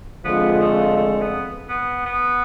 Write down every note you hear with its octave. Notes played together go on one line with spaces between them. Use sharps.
D3 F3 G#3 B3 C4 F4
A3
A3
B3
B3
B3